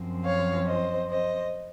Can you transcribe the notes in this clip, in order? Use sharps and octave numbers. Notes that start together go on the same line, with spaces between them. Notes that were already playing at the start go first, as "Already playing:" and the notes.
Already playing: F#2 F3 C4
C#5 F5
C5 D#5
C5 D#5